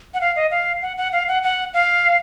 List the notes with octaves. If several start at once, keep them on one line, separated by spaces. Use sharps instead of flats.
F#5
F5
D#5
F5
F#5
F#5
F5
F#5
F#5
F5